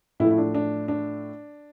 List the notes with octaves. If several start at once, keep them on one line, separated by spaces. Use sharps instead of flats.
A2 F3 A3 E4
E4
D4
D4
D4